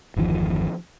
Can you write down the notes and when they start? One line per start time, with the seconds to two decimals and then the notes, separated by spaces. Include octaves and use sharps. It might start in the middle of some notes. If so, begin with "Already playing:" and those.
0.16 G1 E2 D#3 F3